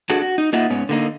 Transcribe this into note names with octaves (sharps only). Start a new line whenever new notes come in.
D4 F#4 G#4 A4
F#4
D#4
A#3 D#4 F4 D#5 E5 F#5
G#2 B3 C#4
D3 A#3 D#4